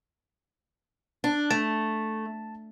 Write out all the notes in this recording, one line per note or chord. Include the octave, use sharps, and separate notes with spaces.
D4
A3 A5